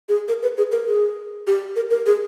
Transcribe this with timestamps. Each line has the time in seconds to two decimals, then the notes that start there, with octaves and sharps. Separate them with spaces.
0.09 G#4
0.28 A#4
0.43 B4
0.58 G#4
0.72 A#4
0.87 G#4
1.47 G4
1.76 A#4
1.90 A#4
2.06 G#4